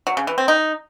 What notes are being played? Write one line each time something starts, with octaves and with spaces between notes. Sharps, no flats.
F#3
C#3
E3
C4
D#4